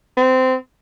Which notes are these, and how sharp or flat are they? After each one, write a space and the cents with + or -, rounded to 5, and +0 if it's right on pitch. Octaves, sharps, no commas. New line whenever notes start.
C4 -20